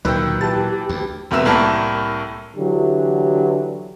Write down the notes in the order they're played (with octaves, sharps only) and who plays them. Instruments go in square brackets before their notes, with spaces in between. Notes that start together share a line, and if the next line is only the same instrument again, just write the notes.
[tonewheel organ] D2 [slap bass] A#2 F#3 [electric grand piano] D#3 [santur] B4 E5 G5
[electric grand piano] E3 A5 A6 [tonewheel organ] G4
[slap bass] D2
[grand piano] E1 E2 C3 B4 E5 E6
C2 A2 A3 A#3 A#4 A5
[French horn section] D3 E3 F#3 E4 G4